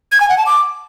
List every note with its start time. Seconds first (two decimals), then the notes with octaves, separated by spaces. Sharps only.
0.12 G#6
0.21 G#5
0.29 F#5
0.38 A5
0.46 D6